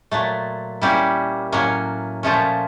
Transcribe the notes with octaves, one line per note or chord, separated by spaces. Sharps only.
A#2 F#3 A3
G3 A#3 C#4 E4 G4
A2 F#3 A#3 C#4
A#2 F3 A3 C#4